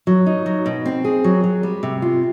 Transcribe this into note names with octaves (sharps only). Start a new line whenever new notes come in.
F#3
D#4
F#3
B2
C4
G#4
F#3
F#3
G3
C3
F4